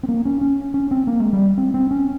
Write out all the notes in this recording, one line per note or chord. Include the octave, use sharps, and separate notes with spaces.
C4
A#3
C#4
C#4
C#4
C4
A#3
G#3
G3
C4
C4
C#4